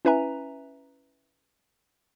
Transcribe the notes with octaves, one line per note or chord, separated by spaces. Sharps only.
C#4 E4 B4 E5 G#5 A#5